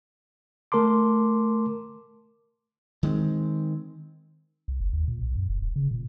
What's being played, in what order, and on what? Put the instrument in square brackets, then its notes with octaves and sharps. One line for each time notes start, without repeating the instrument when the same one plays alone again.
[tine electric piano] A3 A#4 A5 C6 D6
[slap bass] D#3 G#3 B3 C4
[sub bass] C2
F#1
D#2
A#2
B1
F#2
F1
D#1
C#3
A#2